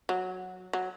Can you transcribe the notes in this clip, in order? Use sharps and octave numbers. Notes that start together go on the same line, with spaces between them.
F#3
F#3